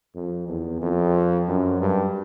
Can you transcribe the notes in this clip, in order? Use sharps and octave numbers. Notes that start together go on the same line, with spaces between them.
F2
E2
F2
F#2
G2